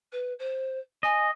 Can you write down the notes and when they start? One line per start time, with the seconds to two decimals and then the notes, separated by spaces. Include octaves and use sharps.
0.12 B4
0.39 C5
1.03 D#5 G#5